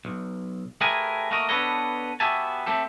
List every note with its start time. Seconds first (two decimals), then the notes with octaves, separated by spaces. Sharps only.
0.05 B1
0.81 A3 G4 G#4 A#4 B4 G#5
1.31 A3 A#3 F#4 A#4 D#5
1.49 B3 D4 A4 B4 C#5 D#5
2.20 B3 F#4 G4 E5 G#5 A5
2.66 A3 C4 G4 A4